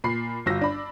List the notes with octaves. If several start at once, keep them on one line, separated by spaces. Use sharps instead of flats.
A#2 B5 C7
G1 F4 F#4 E6 A#6
D4 B5